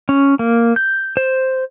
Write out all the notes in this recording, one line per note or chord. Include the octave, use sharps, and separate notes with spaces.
C#4
A#3
G6
C5